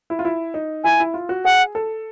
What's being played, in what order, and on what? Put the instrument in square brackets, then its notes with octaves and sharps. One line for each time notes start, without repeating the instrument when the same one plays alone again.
[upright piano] E4
F4
E4
D#4
[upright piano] E4 [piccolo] G#5
[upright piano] E4
F4
F#4
[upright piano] G#4 [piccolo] F#5
[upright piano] A4